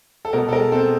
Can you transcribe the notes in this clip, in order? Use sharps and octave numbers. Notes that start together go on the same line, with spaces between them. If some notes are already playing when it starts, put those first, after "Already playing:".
A4
B2 A#4
A4
G#3 A#4
C4 A4